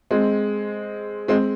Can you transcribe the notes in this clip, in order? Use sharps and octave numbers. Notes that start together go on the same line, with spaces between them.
G#3 C4
G#3 C4